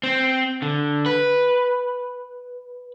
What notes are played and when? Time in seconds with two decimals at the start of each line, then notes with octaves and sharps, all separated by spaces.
0.03 C4
0.62 D3
1.06 B4